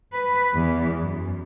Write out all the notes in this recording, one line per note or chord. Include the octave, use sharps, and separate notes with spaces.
B4
E2
F#2